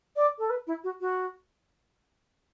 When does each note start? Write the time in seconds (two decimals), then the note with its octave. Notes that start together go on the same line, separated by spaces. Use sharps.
0.16 D5
0.39 A4
0.50 B4
0.67 E4
0.84 F#4
1.01 F#4